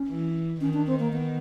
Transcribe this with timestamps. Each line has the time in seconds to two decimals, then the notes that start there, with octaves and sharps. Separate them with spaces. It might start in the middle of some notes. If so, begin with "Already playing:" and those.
Already playing: C#4
0.09 E3
0.61 D#3 C#4
0.73 D4
0.86 C4
0.99 A#3
1.13 B3